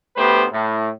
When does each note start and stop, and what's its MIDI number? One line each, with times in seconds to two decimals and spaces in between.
0.16 0.45 38
0.16 0.45 57
0.16 0.45 59
0.16 0.45 67
0.16 0.45 71
0.16 0.45 72
0.52 0.89 45